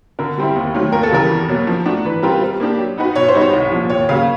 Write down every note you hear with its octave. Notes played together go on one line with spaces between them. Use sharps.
D3 A#4
G3 C4 E4
D#2
D#3 F#3 A3 C4
D#2 A#4
A4
C#3 E3 G3 A#4
E2
B2 F#3 A#3
F3
A3 D4 F#4
E3 B4
G3 C4 F4 A#4
G3 C5
A#3 D4 G4
F#3
B3 D#4 F#4 B4
B2 C#5
C5
G3 B3 D#4 F#4
C#5
C2
A#2 F3
D#2 C#5
C#3 F#3 A#3 F5